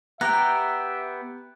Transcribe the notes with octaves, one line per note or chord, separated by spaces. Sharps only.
B3 G4 E5 G5 A#5 F#6